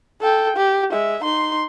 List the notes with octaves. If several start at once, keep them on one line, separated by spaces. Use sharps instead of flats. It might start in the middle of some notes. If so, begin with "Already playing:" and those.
A4 G5
G4
G#3 E5
D#4 C6